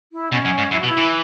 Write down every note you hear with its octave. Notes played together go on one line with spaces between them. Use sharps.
E4
B2 C#4
F#2
G#2
F#2 E4
B2 F#4
E4
E3